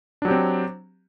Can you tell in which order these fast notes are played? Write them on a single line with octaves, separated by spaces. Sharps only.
D4 F#3 G4 C4